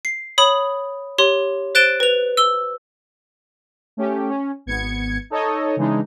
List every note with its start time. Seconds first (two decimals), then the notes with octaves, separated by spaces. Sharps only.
0.05 C7
0.38 C#5 B5 D#6 F#7
1.18 G4 C#5 C6
1.75 C5 F#6 A6 D7 E7 G7
2.00 B4 F7
2.37 E6 G7
3.97 A3 C#4 G4
4.29 C#4
4.66 G#1 B3 G#6 C#7
5.30 D#4 A4 C#5 D#5
5.76 C#3 E3 G#3 D4 D#4